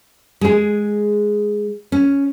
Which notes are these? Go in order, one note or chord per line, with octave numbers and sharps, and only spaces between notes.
G#3 G#4
C#4